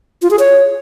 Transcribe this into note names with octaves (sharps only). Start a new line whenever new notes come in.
F4
G#4
C#5